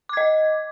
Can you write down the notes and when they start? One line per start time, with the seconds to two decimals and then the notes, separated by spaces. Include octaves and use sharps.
0.09 D6
0.13 G#6
0.17 D#5